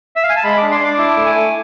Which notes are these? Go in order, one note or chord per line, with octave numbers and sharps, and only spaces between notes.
E5
F5
G#5
A5
G#3 B5
D6
D4
C6
D4 D6
E4 D6
A3
G#5
A3